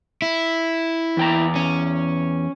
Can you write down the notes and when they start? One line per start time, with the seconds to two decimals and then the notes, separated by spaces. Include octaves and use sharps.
0.22 E4
1.17 E2 G5 A#5
1.56 C#4